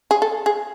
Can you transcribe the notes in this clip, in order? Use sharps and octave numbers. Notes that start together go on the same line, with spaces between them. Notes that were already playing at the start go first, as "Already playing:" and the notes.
G#4
A4
G#4